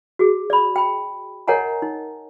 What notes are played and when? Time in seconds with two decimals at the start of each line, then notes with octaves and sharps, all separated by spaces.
0.19 F#4 G#4
0.50 D5 B5
0.76 G5 B5
1.48 A#4 C#5 D#5 F#5 G#5 A#5
1.82 D#4